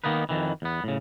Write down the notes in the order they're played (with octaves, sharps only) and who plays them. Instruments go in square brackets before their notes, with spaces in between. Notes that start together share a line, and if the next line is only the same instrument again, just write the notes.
[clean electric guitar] D#3 E3 A#3 B3 D#4 B4
F2 D#3 E3
E2 B3
A2 C#3